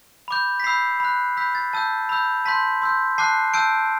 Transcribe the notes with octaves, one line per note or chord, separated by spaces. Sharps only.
B5 D6 G6
B6
B5 E6 G6 C7
B5 F#6
B5 E6 G6 B6
A6
A5 E6 G6 A6
B5 E6 G6
A5 C6 G6 B6
C6 E6 G6
A5 D6 F#6 C7
A5 E6 G6 D7